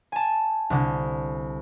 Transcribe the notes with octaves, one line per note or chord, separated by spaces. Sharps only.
G#5 A5
C2 D3